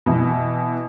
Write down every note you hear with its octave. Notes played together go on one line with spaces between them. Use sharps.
B2 E3